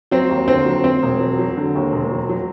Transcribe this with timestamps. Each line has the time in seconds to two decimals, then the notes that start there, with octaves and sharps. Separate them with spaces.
0.11 F#3 C4
0.29 D#2
0.47 D3 C4
0.66 F#3
0.84 F#3 C4
1.02 E1
1.20 F#3
1.39 F#3
1.57 D3
1.75 D#2
1.92 E1
2.11 F#3
2.29 F#3